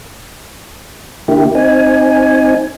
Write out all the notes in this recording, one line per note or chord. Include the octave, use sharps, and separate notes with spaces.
D3 A#3 E4 G4
C4 D#4 G#5